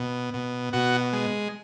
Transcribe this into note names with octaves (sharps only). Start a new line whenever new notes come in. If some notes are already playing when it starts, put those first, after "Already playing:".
Already playing: B2
B2
B2 F#4
G#3